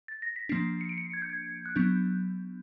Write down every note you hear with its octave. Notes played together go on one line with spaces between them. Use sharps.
A6
A#6
B6
F3 A#3 D4 C7
C#7
D7
C#7
G#6
G6
G#6
F#6
F#3 B3 D4 G6